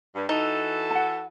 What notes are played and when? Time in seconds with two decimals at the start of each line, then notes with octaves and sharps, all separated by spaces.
0.16 G2
0.29 E3 D#4 F#4 A4
0.91 F#5 A5